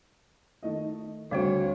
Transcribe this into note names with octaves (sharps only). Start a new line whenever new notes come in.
D#3 A3 D#5
D2 G3 C4 F#4 C5 C#5 F5